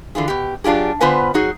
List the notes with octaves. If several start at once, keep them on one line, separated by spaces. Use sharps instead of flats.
D3 E3 F4 G#4
B2 G4
F#3 D4 F4 G4 G#4
D3 B3 F4 B4 C5 G#5
F#3 D#4 F#4 G#4